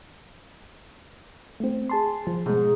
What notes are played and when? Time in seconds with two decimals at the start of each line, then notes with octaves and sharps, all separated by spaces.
1.60 A3 C4
1.89 G#4 A5 C6
2.27 F3
2.46 G#2 B2 G#3